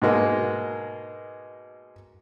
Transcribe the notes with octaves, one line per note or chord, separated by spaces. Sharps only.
G#2 B2 G#3 A#3